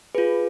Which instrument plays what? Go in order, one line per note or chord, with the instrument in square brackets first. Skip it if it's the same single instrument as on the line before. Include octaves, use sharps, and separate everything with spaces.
[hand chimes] F4 G#4 B4